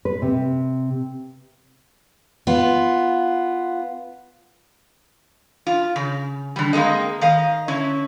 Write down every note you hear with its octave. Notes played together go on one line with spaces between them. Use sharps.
B4
C3
B3 F4
F4
C#3
D3 G3
G#3 A#3 C4 A4 D#5
D#3 D#5 F5
D3 C#4 E4